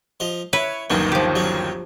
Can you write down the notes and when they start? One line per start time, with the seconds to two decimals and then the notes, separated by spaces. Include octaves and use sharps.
0.20 F3 D#5
0.53 E4 B4 C#5
0.90 G1 D#2 D#3 E3 F#3 C#4
1.12 F3 G4
1.35 F#3 C#4